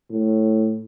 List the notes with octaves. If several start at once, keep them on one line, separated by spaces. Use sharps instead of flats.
A2